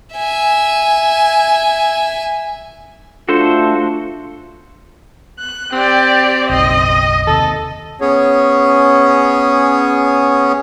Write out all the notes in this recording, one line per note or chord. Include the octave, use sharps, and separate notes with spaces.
E5 G#5
A3 D4 F4 F#4 A4 C5
F#6
C4 G4 D5
F#1 B1 D#5
D#2 C3 A4
B3 C#4 G#4 C#5